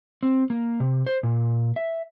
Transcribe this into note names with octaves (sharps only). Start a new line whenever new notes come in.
C4
A#3
C3
C5
A#2
E5